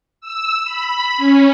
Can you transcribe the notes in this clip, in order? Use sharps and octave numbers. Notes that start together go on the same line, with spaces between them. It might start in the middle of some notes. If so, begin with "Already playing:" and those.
E6
B5
C#4